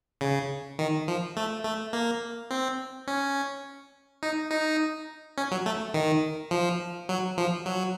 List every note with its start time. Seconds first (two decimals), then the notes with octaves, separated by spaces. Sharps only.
0.21 C#3
0.79 D#3
1.08 F3
1.37 A3
1.64 A3
1.93 A#3
2.51 C4
3.07 C#4
4.23 D#4
4.51 D#4
5.38 C#4
5.51 F#3
5.66 A3
5.94 D#3
6.51 F3
7.09 F#3
7.38 F3
7.66 F#3